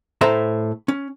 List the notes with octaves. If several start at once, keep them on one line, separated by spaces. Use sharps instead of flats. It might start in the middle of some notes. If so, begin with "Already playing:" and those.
A2 A4 C5 E5 A#5
C#4